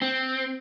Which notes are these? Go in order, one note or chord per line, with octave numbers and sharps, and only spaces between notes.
C4